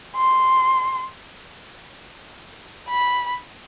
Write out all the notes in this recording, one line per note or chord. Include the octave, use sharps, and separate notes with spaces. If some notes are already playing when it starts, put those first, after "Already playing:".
C6
B5